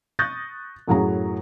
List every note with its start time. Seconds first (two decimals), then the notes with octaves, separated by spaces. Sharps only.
0.19 C#6 D#6 F#6 G6 A6 A#6
0.88 F#2 A2 F#3 G#4 F#5 A#5